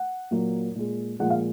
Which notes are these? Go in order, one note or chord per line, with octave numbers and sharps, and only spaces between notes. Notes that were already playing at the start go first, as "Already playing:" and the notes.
Already playing: F#5
A#2 F#3 A#3
A#2 G#3
A#2 F3 G#3 F#5
F5